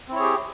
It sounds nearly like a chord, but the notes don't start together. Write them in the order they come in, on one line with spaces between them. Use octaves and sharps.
C4 E4 C#5 G#4 G4